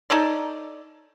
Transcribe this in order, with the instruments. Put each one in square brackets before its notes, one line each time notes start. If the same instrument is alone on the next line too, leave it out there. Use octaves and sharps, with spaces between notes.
[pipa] D#4 A4 C#5 D5